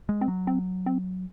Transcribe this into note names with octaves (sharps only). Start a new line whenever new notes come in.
G#3
C4
F#3
C4
C4